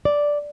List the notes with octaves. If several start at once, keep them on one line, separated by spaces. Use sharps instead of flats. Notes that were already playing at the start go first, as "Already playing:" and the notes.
D5